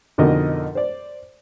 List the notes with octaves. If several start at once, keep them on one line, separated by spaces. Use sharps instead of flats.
F2 B2 D3 D#4 A#4 D#5
C5 D5